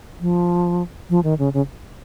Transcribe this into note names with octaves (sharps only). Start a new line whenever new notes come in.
F3
F3
D#3
C#3
C#3